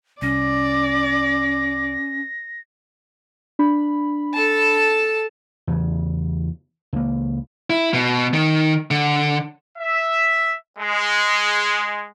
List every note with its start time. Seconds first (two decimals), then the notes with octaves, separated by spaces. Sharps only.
0.22 C2 C#4 D5 A#6
3.59 D4 B5
4.34 A4 A5
5.67 E2 C#3
6.93 C#2 A#3
7.70 E4
7.93 B2
8.34 D#3
8.91 D3
9.78 E5
10.79 G#3